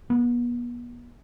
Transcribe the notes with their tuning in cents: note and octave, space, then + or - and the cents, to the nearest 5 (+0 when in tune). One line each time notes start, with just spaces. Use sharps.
B3 -40